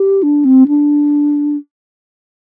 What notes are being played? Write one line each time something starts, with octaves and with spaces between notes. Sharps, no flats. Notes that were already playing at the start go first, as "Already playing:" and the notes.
Already playing: G4
D4
C4
D4